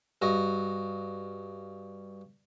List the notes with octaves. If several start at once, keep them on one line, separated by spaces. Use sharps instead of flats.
G2 F#4 D#5